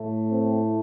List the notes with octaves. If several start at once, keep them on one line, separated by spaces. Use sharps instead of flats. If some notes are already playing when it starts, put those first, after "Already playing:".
Already playing: A2 A3
C4